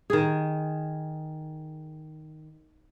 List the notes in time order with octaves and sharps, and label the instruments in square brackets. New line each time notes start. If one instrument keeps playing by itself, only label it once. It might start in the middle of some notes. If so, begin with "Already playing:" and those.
[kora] D#3 G#4